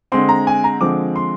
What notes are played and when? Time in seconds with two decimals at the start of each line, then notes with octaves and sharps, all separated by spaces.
0.12 D3 G#3 C4 C6
0.29 A#5
0.47 G#5
0.64 A#5
0.81 D3 F3 G#3 C4 D6
1.16 C6